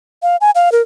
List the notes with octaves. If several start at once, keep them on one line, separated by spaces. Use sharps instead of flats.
F5
G#5
F5
A#4